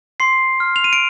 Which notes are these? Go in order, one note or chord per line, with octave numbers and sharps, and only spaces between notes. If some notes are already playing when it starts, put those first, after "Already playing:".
C6 C7
F6
F7
D#7
D7